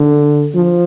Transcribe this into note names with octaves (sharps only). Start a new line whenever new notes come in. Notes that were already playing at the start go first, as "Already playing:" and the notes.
Already playing: D3
F3